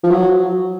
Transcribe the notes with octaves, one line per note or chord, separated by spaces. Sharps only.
F3
F#3